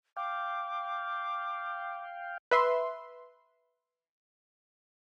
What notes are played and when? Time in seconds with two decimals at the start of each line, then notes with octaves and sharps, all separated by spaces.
0.17 F5 G5 D6
2.51 B4 E5 C6